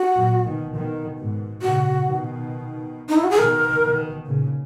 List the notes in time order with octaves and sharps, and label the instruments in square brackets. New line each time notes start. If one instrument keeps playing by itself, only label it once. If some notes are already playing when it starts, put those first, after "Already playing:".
Already playing: [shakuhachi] F#4
[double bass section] F#2 A#2
B2 D#3
B2 D#3
G#2 B2
[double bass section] A#2 C#3 [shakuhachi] F#4
[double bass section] B2 D#3
[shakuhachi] D#4
E4
F#4
G#4
[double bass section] B2 D#3 [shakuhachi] A#4
[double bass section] B2 D#3
A#2 C#3